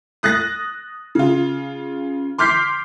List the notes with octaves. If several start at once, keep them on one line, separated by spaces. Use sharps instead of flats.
D#6 F#6 A6 A#6
C#3 F4
C6 D6 F6 G6 B6 C7